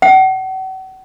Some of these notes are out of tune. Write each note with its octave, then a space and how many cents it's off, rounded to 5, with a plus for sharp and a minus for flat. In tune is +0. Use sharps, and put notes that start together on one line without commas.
F#5 +40